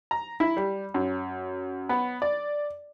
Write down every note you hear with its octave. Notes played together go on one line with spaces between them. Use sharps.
A#5
E4
G3
F#2
B3
D5